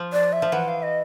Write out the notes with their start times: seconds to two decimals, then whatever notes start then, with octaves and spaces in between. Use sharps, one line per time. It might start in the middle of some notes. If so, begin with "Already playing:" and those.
Already playing: F3
0.13 D5
0.33 E5
0.42 F3
0.52 E3 F#5
0.68 F5
0.83 D#5